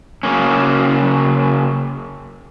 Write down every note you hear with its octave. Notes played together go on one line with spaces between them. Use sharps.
C#3 F#3 A#3 C#4